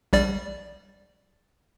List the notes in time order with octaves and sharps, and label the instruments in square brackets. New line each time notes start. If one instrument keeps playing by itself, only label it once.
[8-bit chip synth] A#1 G3 D5